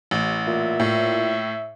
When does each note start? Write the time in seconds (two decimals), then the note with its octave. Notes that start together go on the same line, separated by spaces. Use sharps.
0.11 A1
0.47 A#2 E5
0.80 A2